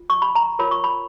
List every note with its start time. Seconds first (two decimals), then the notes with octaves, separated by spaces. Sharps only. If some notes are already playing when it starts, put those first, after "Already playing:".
Already playing: F4
0.10 C#6
0.22 B5
0.35 A#5
0.59 F4 A#4 C#5 B5
0.71 C#6
0.84 B5